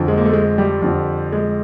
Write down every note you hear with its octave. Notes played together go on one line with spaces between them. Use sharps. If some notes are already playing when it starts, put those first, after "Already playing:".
Already playing: F2 D3 F3
G#3
A#3
A3
G#3
G3
F2 D3 F3
G#3